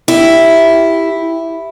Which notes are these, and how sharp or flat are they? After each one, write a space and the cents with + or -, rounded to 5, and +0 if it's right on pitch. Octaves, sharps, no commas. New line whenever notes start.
E4 +0 G4 +0